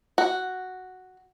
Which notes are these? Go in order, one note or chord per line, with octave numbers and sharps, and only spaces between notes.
F#4